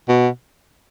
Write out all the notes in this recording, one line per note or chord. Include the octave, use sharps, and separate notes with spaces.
B2